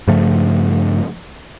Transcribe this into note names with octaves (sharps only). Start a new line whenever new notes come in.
G2 C#3 F3 A3